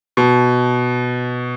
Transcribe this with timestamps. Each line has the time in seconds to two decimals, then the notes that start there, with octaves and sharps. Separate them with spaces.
0.17 B2